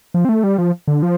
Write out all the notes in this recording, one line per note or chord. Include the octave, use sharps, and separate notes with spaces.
F3
C4
A3
G3
F3
D3
F3